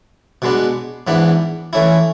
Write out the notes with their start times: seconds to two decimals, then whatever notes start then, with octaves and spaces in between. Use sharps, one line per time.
0.42 B2 G#3 B3 D4
1.07 G#2 E3 B3 D4
1.73 E3 A3 C#4 E4